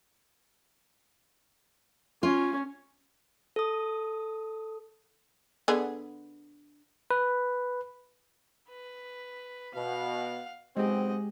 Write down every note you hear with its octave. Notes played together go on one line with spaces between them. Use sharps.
C#4 F4
A4 D#6
D3 B3 G#4
B4
B4
B2 F5 F#5
B1 G#3 C4 G4 G#4 D#5 F#5